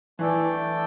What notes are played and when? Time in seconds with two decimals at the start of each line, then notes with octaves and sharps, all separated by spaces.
0.19 E3 A3 D4 A4 D5 G5